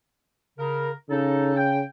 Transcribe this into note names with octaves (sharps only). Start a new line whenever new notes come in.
C#3 A#4
C#3 D#4 A4
G5